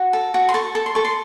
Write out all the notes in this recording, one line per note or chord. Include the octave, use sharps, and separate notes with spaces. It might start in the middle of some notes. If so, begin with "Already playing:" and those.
Already playing: F#4
A4
F#4
C6
A4 C#6
A4
C6
A4 C#6
C6